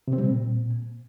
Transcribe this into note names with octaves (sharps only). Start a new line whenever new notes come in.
C3
C4
G3
A#2